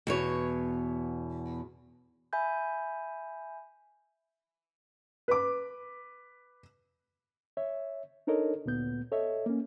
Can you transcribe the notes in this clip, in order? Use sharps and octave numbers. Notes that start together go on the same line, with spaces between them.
E2 B2 C#5
E5 G#5 B5 G6
B4 D6
C#5 E5
D4 D#4 A4 A#4 C#5 D#5
D2 A#2 B3 G6
A4 C#5 D#5 E5
A#3 C#4